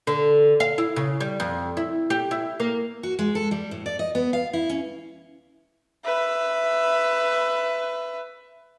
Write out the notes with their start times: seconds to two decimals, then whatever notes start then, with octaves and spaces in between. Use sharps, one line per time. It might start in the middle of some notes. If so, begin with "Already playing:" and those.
0.07 D3
0.60 F5
0.78 E4
0.96 C#3
1.20 G3
1.40 F2
1.77 E4
2.10 G4
2.31 E4
2.60 A#3
3.03 F#4
3.19 G#3
3.35 A4
3.51 G3
3.71 A2
3.86 D5
3.99 D#5
4.15 B3
4.33 F5
4.53 E4
4.69 C#4
6.05 B4 E5